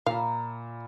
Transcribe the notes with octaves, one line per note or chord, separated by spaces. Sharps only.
A#2 E5 F5 A#5 B5